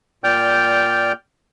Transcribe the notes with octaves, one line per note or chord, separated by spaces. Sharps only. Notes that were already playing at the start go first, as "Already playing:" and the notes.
A#2 D5 G5 F6 G6